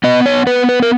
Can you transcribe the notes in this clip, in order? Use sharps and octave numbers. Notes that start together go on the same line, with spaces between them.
B3 D#5
C#5
B3 B4
B4
A#4